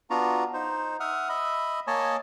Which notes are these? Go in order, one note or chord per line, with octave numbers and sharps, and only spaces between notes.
B3 D4 F4 F#4 A#5
D#4 C5
E5 F#5 D#6 F6
D#5 E5 B5
A#3 C#5 D#5 G#5 A5